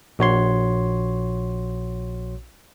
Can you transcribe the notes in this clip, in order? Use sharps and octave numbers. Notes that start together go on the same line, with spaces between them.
A#1 F#4 C#5 C6